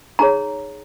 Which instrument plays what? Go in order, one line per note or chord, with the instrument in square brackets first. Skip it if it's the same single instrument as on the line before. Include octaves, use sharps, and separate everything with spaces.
[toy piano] D#4 G#4 C#5 A#5